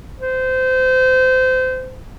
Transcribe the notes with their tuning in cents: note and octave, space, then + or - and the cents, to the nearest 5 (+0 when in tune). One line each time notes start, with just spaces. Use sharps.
C5 -25